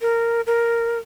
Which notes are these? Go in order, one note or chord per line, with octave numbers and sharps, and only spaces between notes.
A#4
A#4